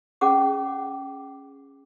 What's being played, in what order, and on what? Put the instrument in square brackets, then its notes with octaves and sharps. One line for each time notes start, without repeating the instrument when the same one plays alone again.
[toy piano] C#4 G#4 F#5 D6